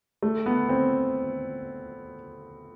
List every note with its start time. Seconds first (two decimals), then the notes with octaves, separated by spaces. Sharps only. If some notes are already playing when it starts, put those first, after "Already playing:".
0.22 A3
0.46 B3
0.69 C4